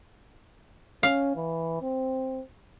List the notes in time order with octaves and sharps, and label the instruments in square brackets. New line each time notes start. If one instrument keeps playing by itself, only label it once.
[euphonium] C#4 [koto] F5
[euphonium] E3
C4